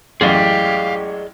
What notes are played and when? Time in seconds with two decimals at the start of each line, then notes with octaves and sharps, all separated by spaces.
0.21 A1 F#2 E4 G4 G#4 D5 D#5 F5